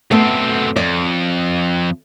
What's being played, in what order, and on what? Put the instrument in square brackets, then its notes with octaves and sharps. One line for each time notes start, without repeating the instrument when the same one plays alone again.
[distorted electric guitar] F#2 C4 [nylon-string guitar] A3 B3 A4
[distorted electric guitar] F2 [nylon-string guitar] D5